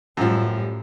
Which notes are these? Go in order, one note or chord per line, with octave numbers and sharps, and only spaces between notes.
F#2 A2 F3 G3